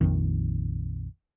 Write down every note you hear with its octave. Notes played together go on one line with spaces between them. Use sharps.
A#1 F2 D#3